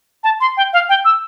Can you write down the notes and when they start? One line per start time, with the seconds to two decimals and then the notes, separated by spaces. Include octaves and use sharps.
0.24 A5
0.41 C6
0.57 G5
0.73 F5
0.89 G5
1.05 E6